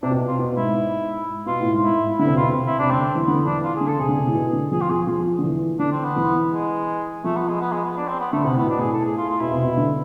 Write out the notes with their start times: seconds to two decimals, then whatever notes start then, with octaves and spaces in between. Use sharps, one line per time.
0.03 C3 D4
0.11 B2
0.19 C3
0.27 F4
0.39 B2
0.56 G#2 E4
1.46 B2 F4
1.60 A2
1.74 G#2
1.84 A2 E4
2.19 D3 E4
2.27 C3
2.35 B2 F4
2.42 C3
2.67 E4
2.79 C3 D4
2.91 D3 C4
3.15 E3
3.27 D3 B3
3.45 E3 D4
3.63 F4
3.76 G#4
3.81 D3
3.88 A4
3.99 C3 G#4
4.09 D3
4.17 C3
4.27 A2
4.35 B2
4.53 D3
4.72 F3 G#4
4.82 F4
4.89 F3 G#4
5.07 F3
5.39 D3
5.44 E3
5.79 D3 D4
5.92 C4
6.04 B3
6.16 E3
6.52 G#3
7.24 F3 A3
7.36 B3
7.48 G#3
7.61 B3
7.72 G#3
7.85 B3
7.97 D4
8.08 C4
8.20 B3
8.32 D3 A3
8.44 C3 B3
8.56 A2 B3
8.66 B2 D4
8.76 A2 G#4
8.93 A4
9.05 G#4
9.17 F4
9.29 F4
9.41 B2 E4
9.52 C3
9.63 B2
9.77 D3